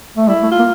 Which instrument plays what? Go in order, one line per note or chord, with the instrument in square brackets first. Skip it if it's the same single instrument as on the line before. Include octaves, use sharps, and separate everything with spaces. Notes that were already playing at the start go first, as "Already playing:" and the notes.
[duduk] A3
[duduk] G3 [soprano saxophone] E4
[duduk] A3
[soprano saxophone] F4
[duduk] A#3